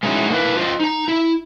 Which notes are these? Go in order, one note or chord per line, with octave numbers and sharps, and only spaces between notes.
G#3 C#4 D#4 E4 F#4
A#3 C4 D4 E4 B4
F4 C5 D#5
D#4 A#5
E4